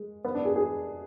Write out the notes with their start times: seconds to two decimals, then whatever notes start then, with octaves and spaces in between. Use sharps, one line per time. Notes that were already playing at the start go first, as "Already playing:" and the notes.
Already playing: G#3
0.25 B3
0.35 D4
0.45 G#4
0.56 G#4